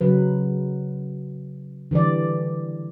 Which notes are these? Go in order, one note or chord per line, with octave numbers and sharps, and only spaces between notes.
C#3 F#3 B4
D3 E3 G3 D5